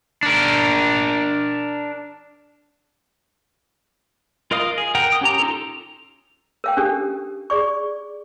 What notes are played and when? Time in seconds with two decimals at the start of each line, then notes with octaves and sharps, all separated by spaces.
0.23 D4 A#4
4.51 F4 A#4 D#5 F5 D#6
4.78 G#4
4.95 A#4 F#5 G5
5.10 G5 D#6
5.21 C#4 G4 A#5
5.39 D#4 F4 A4
6.64 A#4 F5 G5
6.77 C#4 D4 G4 A4
7.50 G#4 D5 C#6